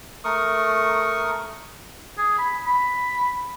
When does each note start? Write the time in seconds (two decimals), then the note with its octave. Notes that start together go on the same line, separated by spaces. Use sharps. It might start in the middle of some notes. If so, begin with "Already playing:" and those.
0.24 A3 A#4 C#6 D#6
2.18 G#4
2.38 B5
2.66 B5